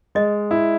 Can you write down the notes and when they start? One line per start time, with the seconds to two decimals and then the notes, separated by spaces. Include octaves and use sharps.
0.15 G#3 D#5
0.51 E4